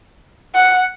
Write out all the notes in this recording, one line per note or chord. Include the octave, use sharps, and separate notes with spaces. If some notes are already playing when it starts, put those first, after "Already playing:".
F#5